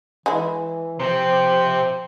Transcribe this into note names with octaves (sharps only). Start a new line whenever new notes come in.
E3 G#3 E4
C3 F3 C4 C5